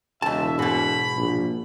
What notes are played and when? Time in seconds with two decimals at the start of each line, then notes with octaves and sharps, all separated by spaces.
0.22 E1 C#2 E5 A5
0.59 G#2 B2 B5
1.17 A#1